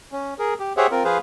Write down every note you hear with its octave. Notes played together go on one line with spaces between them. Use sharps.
C#4
G#4 A#4
G4
G4 G#4 C5 C#5 E5 F#5
C4 F4 A#4
F3 G#4 B4 C5 F5